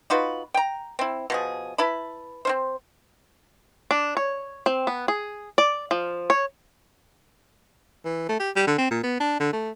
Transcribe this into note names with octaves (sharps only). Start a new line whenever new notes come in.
D#4 F4 F#4 B4
G5 A#5
C4 E4
B2 F3 G#4
E4 B4 A5 B5
C4 C#4 C5
D4
C#5
C4
B3
G#4
D5
F3
C#5
E3
A3
G4
G3
D3
C4
A#2
B3
D4
D3
A3